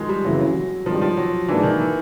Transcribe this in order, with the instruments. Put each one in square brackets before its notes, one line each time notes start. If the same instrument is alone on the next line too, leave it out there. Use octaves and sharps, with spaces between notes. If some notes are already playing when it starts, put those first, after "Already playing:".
Already playing: [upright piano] D#3 F3 G#3
G3
[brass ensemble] F#1 F2 C#3 E3 [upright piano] F#3
[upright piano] F#3
[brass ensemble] G#1 G2 D#3 G3 [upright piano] F3
[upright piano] F3
F#3
[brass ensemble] G#2 F3 A#3 D4 [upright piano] E3
[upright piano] D#3
E3